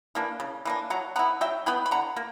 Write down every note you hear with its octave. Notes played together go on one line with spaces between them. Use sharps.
E3 A#3 D4
C#3
E3 A#3 D4
F#3 F#5 A#5
B3 E4 F#5 A#5
F#3 E5 G5
B3 E4 G5 B5
B5
D3 F#5 A#5
A#3